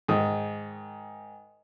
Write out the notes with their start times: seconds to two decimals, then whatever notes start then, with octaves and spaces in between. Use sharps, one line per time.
0.08 G#2 D#3 D#6